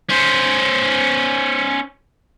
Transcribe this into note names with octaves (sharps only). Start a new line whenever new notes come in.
C#4 C5